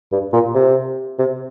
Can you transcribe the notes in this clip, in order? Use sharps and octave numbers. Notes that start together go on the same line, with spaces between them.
G2
A#2
C3
C3